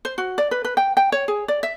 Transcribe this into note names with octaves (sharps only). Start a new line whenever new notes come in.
C5
F#4
D5
B4
B4
G5
G5
C#5
G#4
D5
E5